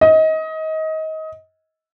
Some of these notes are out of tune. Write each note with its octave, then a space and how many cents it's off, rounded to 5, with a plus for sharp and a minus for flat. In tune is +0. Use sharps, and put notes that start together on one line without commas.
D#5 +25